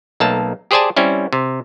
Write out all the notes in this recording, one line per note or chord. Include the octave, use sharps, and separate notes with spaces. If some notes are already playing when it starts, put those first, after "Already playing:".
B1 A3 A#3 A5
G4 G#4 C5 D5 G#5 A5
G3 C4 C#4 E4
C3